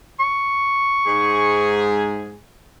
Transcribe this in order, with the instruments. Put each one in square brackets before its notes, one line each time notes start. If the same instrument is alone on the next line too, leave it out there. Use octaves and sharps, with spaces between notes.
[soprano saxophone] C#6
[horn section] G#2 G#4